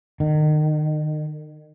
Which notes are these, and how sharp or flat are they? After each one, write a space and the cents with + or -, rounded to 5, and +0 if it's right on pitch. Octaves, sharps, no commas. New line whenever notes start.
D#3 -30